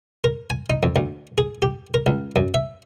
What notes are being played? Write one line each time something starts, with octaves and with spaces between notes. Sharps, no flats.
A#4
G#5
D#4
F2
D2
G#4
G4
A#4
C#2
F#2
E5